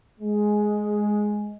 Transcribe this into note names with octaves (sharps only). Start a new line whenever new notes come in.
G#3